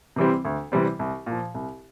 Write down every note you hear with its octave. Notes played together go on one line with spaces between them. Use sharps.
C3 E3 G3 C4
D2
C3 E3 G3 C4
C2
A#2 F3
C2